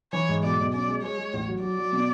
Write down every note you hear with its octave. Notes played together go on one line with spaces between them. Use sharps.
E3 C#5
G#2
B1 D5
B1
C#4 D5
G#3
G#3 C#5
G#3
A1
F#3
F#3 D5
F#3
B2